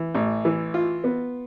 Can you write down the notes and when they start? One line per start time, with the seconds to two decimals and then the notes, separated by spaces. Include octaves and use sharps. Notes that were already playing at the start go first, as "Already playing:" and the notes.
Already playing: E3
0.15 A1
0.45 E3
0.74 F4
1.04 B3